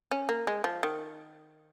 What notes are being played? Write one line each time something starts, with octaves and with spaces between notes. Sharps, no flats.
C#4
A#3
G#3
F3
D#3